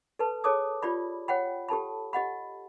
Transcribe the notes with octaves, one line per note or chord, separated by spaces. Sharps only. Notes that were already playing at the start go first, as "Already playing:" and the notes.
A4 B4 A5
G#4 A4 C#5 A5 D6 D#6
F4 G4 D5 B5
C#5 F#5 G5 B5
G4 A4 A5 B5
G4 D#5 F#5 B5